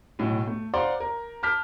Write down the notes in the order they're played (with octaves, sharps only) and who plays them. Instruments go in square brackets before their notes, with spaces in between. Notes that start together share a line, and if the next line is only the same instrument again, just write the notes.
[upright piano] B1 A2
A3
C5 D5 F5 F#5 A#5 C6
A#4
A5 D6 F6 G6 B6